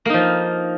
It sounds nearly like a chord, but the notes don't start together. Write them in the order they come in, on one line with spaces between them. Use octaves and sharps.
A#3 D#4 F3